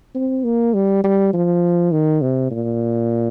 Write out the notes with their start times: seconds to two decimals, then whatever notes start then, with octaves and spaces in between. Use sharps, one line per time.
0.15 C4
0.44 A#3
0.74 G3
1.04 G3
1.33 F3
1.92 D#3
2.22 C3
2.51 A#2